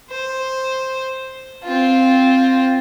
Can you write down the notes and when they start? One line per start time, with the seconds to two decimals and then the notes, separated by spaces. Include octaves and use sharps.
0.11 C5
1.64 C4 F4